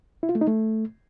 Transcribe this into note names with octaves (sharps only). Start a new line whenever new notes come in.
E4
F4
A3
D#4
A3